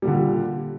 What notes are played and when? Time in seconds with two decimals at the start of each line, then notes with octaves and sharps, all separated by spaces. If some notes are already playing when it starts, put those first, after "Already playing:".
0.02 G3
0.05 A#2
0.08 D3